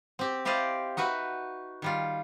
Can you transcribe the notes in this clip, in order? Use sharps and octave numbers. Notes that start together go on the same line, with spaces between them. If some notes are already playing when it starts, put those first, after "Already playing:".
C4 G4
E4 G4 C5 D5 D#5 F5
D#4 F#4 B4 E5
D#3 G3 F4